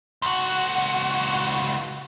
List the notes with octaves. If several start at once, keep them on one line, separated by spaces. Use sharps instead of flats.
C#2 F#4